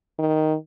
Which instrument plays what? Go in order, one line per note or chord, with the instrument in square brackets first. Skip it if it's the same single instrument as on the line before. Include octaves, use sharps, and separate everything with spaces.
[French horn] D#3